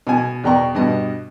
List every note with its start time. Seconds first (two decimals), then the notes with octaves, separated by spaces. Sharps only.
0.07 B2 G#5
0.44 E2 B2 D5 G5 A#5 C#6
0.75 G2 B2 D#5